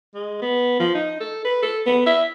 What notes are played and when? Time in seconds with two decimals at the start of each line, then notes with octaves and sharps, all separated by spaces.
0.14 G#3
0.42 B3
0.79 F3
0.94 D#4
1.20 A4
1.44 B4
1.62 A4
1.86 B3
2.06 E5